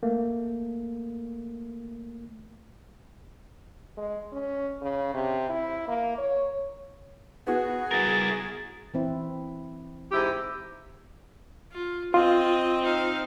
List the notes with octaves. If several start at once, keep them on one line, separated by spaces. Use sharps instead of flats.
A3 A#3
G#3
C#4
C#3
C3
E4
A#3
C#5
B3 F#4 G#4
E4 A#4 A6
E3 C4 E4
G#2 E4 G4
F4
C4 F4 D#5
D#4 F5